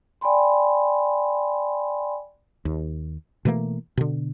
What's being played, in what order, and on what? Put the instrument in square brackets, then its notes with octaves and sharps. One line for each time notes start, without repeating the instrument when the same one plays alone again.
[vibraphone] D5 G5 G#5 B5 C6
[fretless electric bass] D#2
B2 E3 A3 A#3
B2 D3